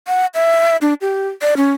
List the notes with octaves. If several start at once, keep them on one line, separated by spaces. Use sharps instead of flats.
F#5
E5
D4
G4
D5
C#4